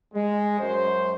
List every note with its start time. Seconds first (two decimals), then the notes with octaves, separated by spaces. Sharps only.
0.13 G#3
0.60 F#2 C5